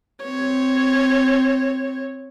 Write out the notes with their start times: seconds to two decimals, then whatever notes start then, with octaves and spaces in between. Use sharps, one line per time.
0.24 C4 C#5